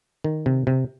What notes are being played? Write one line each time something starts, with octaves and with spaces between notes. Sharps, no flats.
D#3
C3
C3